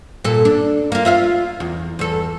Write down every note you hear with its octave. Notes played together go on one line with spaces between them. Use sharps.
A#2 A4
D4
A#3 F4
F4 E5 F5
E2
E2 A4